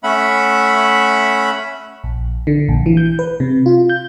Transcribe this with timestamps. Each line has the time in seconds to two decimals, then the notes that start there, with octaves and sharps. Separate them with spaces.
0.04 A3 C#4 E5 F#5 B5
2.04 A#1
2.47 D3
2.69 A#1
2.86 E3
2.97 G6
3.19 B4
3.40 C3
3.66 F4
3.89 G6